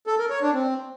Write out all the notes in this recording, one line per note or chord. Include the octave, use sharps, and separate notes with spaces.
A4
A#4
C#5
D4
C4